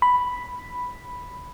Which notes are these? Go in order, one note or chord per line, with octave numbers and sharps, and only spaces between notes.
B5